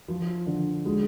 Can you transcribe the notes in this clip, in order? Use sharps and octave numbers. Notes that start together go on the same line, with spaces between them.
F3
D3
G#3